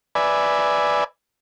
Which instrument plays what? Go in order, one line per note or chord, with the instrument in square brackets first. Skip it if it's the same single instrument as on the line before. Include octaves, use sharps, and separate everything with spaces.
[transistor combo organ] B4 D5 E5 G#5